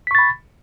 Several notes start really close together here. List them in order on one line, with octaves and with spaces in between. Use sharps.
B6 C#6 A6 B5